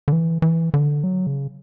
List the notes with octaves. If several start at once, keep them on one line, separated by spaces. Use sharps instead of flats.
D3
E3
E3
D3
F#3
C#3